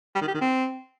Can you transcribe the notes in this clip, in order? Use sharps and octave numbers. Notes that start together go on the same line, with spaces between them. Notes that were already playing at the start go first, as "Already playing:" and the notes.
G3
D#3
G4
D#3
C4